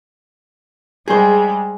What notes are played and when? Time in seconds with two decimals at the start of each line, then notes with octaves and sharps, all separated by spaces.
1.08 G3 G#3 G#4 C5